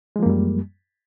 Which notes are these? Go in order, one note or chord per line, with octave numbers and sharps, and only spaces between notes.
F#2 F3 G3 G#3 A#3